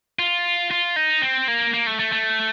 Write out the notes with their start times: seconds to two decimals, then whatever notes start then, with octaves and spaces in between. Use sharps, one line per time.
0.19 F4
0.71 F4
0.96 D#4
1.22 C4
1.48 A#3
1.74 A#3
1.87 A3
1.99 A3
2.12 A3